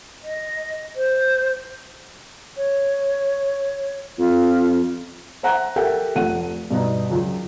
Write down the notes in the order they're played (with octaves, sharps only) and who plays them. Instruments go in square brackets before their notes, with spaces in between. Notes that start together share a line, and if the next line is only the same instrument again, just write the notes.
[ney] D#5
C5
[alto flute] C#5
[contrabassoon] F2 [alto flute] F4
[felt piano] C5 E5 F#5 A#5 F#6
G4 A4 A#4 E5 F#5 G5
F1 A3 F#5 D#7
G2 B2 B3 D#4
C#2 F#2